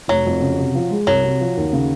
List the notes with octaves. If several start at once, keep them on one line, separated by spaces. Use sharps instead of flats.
F1 F#3
F2
C#3
C3
F3
G#3
C2 F#3
C3
F3
D#2
C#3